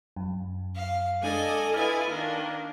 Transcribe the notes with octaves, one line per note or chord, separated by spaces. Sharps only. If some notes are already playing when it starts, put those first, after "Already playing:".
F#2
F5
G#3 D4 A4 D5 D#5 G#5
E4 F4 B4 G#5 F6 A6
D#3 A#3 D4 A#4